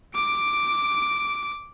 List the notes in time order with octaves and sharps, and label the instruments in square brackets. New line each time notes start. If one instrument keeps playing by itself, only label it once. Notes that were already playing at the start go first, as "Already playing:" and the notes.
[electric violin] D6 D7